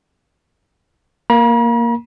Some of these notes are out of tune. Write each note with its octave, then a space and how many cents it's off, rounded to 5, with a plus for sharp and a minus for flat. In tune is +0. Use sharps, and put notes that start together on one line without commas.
A#3 +0 A#5 +45